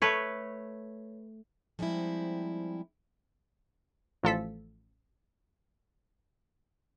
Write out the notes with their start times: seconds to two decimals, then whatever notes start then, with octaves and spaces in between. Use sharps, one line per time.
0.02 A3 B4 C#5
1.79 F3 G3 G#3 C4 E4
4.23 A1 F3 A4 B6